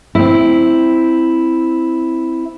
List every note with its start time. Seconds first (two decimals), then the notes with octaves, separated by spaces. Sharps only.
0.15 C4 E4